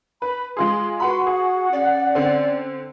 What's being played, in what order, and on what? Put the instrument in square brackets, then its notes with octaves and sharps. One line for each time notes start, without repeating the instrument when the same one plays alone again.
[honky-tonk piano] B4 [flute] B5
[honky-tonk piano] G#3 F4 G#4 [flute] C6
[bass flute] F#4 [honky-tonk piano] B4 F#5 B5 [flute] C6
[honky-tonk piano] G#4 [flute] F#5
[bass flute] C#4 [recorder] D5
[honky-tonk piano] D3 C4